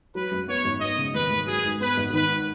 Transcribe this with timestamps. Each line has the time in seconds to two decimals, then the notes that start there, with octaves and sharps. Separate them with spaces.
0.15 F#3 B4
0.31 F#2
0.48 B3 C#5
0.65 G#1
0.81 B3 D#5
0.97 C#3
1.14 D#2 B4
1.30 D#2
1.47 F#3 G#4
1.64 G#2
1.80 B3 B4
1.97 G#1
2.13 D#3 B4